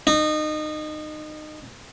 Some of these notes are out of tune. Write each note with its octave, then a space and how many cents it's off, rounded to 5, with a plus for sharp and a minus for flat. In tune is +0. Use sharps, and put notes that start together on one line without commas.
D#4 -25